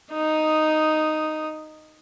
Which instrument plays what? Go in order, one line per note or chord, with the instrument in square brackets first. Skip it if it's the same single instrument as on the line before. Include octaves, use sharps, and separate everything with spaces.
[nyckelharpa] D#4 D#6